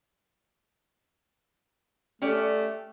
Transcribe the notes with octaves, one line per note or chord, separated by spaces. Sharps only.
A3 C#4 G4 D5